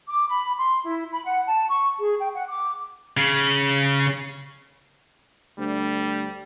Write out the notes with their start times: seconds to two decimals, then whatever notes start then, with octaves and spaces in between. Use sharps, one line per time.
0.08 D6
0.29 B5
0.57 C6
0.85 E4
1.11 B5
1.26 F#5
1.47 A5
1.69 C#6
1.99 G#4
2.20 G5
2.34 F#5
2.48 D6
3.17 C#3
5.58 D2 G3